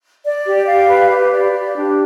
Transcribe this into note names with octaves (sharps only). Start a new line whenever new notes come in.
D5
G4
F5
B4
G4
D5
G4
D4